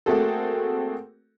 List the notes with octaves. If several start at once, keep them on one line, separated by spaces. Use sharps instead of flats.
A3 A#3 C4 F#4 G#4 A4